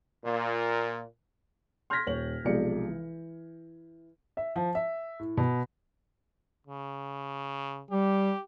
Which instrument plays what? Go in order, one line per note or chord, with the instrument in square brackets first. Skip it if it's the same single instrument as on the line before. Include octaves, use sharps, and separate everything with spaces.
[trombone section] A#2
[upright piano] C6 F6 G6 G#6 A#6 B6
D#1 C#5 F#7
B1 C3 F3 G#3 D5 C#7
E3
E5
F3
E5
A2
B2
[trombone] C#3
[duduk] G3 [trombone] G4